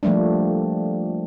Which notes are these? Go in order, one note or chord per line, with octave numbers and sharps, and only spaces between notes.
F3 G3 A3 A#3 D4